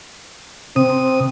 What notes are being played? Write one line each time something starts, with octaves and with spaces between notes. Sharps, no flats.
C3 C4 D#6